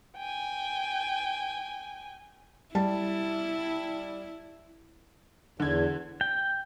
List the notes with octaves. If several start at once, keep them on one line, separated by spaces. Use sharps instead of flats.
G5 G#5
G3 E4 A5
E2 D3 G#6
G5